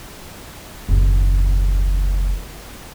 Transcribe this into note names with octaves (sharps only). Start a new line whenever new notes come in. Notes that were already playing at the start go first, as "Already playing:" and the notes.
F#1 D#2